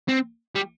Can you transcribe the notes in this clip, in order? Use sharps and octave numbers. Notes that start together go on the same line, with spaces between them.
C4
G3